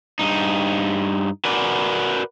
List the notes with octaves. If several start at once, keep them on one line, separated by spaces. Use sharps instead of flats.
G2 D#4
F#4 A#4 B4 D5 G#5